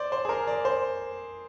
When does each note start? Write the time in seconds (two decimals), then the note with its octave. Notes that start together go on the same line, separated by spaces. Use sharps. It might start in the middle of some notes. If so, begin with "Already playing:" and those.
Already playing: C5 D5
0.12 C5
0.25 G#4
0.29 A#4
0.47 D5
0.65 C5